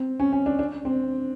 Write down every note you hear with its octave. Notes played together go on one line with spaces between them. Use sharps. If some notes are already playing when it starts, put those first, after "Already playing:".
Already playing: C4
C#4
C#4
D4
D4
C4